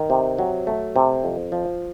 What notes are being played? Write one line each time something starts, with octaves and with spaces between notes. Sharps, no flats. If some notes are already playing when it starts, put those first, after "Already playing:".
Already playing: D#3
C3
F#3
A3
C3
F2
F3